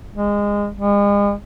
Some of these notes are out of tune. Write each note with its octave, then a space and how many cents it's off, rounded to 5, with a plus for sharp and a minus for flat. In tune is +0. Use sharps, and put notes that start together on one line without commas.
G#3 -20
G#3 -40